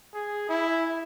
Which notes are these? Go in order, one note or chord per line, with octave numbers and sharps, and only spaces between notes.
G#4
E4